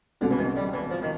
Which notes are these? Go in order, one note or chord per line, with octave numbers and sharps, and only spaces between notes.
C2 B2 D3 G#3 C#4 F#4
E3
D#3
G3
E3
F3
D#3